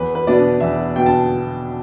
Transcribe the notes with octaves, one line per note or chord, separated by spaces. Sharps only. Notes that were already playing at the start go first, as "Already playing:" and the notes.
Already playing: E2 B4
B4
B2 B3 D4 D5
E2 E5
B2 B3 D4 G5
A5